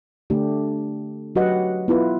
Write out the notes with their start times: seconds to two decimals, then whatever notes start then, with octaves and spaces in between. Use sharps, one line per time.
0.30 D3 A3 D4 G4
1.35 F#3 F#4 G4 B4 D#5 F#5
1.88 B3 E4 F4 B4